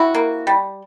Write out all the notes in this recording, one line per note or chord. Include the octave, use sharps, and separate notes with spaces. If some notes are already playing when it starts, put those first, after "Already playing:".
Already playing: C3 E4 F#4
A#3
G3